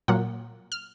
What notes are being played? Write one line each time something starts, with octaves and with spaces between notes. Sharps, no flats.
A#2 F#3 A#3 F#5
F6